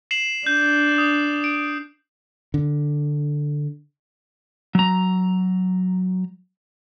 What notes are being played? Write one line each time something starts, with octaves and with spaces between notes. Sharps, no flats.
C7 E7 F#7
D4 G6
D#6
D7
D3
F#3 A#5